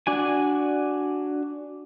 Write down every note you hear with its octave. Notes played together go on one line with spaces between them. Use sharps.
D4 F#4 G#5